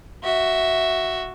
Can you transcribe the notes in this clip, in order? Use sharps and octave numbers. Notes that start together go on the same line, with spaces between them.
F#4 E5